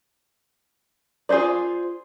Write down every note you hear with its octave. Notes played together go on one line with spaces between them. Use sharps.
F4 G#4 A4 C5 D5